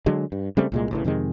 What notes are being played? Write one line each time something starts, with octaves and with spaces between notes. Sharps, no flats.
D3 F#3 G#3
G2
C#3 G3 A3 C4
C2 A#2 G#3
A1 C#3 E3
F2 C3 D#3 G#3